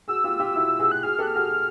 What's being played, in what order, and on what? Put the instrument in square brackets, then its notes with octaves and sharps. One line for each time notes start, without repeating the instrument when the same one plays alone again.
[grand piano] F#4 G#4 [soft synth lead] E6
[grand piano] F4 G4
F4 G4
E4 F#4
F#4 G#4
[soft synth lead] F#6
[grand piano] F#4 G#4 [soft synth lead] F6
[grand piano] G4 A4 [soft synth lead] F#6
[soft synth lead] F6
[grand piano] F#4 G#4